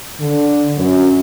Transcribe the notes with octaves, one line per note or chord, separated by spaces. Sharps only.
D3
F#2